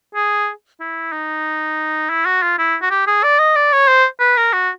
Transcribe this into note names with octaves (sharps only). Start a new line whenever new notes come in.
G#4
E4
D#4
E4
F#4
F4
E4
F#4
G4
G#4
D5
D#5
D5
C#5
C5
B4
A#4
F#4